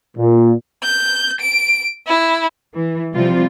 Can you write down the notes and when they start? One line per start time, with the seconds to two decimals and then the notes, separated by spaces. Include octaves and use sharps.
0.18 A#2
0.83 G6
1.40 D7
2.07 E4
2.75 E3
3.13 C3 F3 G3 C4 F4